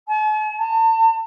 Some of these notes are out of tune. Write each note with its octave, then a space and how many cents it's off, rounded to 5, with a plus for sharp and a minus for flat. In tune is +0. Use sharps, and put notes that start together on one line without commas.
A5 -45
A5 +40